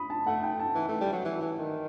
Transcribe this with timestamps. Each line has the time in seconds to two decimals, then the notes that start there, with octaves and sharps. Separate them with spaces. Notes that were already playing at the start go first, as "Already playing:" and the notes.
Already playing: B5 D#6
0.10 A5
0.26 A3 F#5
0.43 G5
0.59 A5
0.75 E3
0.89 A3
1.01 G3
1.13 F#3
1.25 E3
1.41 E3
1.58 D#3